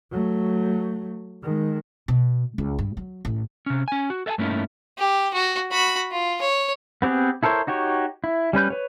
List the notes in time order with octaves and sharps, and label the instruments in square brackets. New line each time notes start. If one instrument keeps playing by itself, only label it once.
[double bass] F#3 A3
D#3 G#3
[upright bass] B2
C#2
G2
F#3
A1
[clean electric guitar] C3 C#4
C#4 G#5
F#4
A4 D#5 E5 G#5 A5
G2 A3 A#3 C#4 D#4 E4
[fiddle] G4
F#4
F#4 B5
F4
C#5
[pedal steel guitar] B3 C4 G4 G#4 B4
E4 A4 A#4 C5 C#5
D#4 F#4 G4 C#5
E4
G3 C#4 B4 G6
B4 C#5